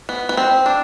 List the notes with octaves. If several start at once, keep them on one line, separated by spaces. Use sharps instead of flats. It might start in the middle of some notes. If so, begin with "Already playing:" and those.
B3
B3
C4
D4